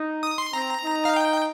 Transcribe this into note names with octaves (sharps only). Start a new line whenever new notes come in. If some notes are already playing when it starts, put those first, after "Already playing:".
Already playing: D#4
D#6
C6
C4 A#5
D#4
F5
G5